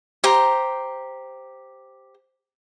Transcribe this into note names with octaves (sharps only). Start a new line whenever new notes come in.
G4 C5 A#5